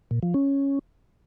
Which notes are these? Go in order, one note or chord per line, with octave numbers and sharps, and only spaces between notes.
A#2
F3
C#4